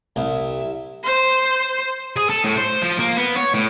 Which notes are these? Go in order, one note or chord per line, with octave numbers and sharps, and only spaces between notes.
C2 E5
C5
G#4
A4
A2
C5
F3
A#3
B3
C#5
A2